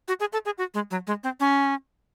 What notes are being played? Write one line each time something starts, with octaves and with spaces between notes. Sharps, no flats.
F#4
G#4
A4
G#4
F#4
G#3
F#3
G#3
C4
C#4